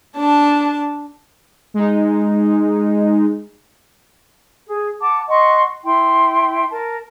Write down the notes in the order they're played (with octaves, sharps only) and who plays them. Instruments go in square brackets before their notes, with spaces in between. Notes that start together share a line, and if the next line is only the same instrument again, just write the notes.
[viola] D4 A5
[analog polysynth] G#3 D#4
[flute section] G#4
F#5 A5 D6
D#5 F#5 C6 C#6
E4 G5 C6
A#4 A5